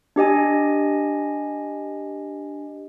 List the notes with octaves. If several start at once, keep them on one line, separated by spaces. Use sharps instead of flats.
D4 G4 D#5 G#5